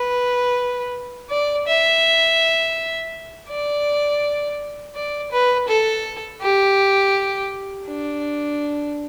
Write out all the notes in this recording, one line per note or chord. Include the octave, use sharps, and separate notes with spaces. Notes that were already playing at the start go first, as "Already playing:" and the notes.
Already playing: B4
D5
E5
D5
D5
B4
A4
G4
D4